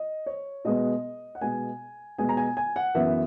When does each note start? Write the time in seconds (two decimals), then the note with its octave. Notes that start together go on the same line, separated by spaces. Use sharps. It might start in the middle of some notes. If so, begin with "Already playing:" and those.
Already playing: D#5
0.26 C#5
0.65 B2 G#3 B3 D#5
1.35 F#5
1.41 B2 G#3 B3 G#5
2.18 B2 G#3 B3 G#5
2.29 A#5
2.37 G#5
2.57 G#5
2.76 F#5
2.95 F#2 E3 B3 E5